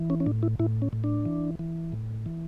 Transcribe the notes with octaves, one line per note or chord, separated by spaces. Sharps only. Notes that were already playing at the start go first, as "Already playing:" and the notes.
Already playing: E3
C#4
C#4
A2 D4
E4
A2 E4
C#4
A2
D4
E3
E3
A2
E3